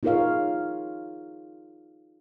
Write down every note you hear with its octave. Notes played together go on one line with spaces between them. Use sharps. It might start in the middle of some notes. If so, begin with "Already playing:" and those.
D#4 F4 G#4 A#4 C#5 F5